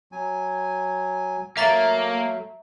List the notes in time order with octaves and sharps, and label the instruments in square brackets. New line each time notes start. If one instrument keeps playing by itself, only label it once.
[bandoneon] F#3 G#5
[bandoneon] F#3 A3 [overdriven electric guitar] A#3 [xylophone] E5 A#5 A6